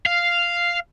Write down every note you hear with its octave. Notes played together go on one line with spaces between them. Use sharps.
F5